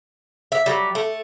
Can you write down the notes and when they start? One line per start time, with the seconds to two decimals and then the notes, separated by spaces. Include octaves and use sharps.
0.52 E5
0.66 F#3 G3
0.95 A3